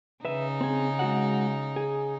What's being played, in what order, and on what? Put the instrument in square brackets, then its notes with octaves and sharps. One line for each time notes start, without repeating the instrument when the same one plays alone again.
[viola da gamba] C#3 D#4 [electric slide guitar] B4 E5
[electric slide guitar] C4 G#4
G#3 F#4 F#5
G#4